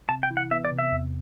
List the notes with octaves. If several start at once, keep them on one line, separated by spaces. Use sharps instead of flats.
C3 A5
G5
E3
F#5
B3 E5
D5
C3
E5
E2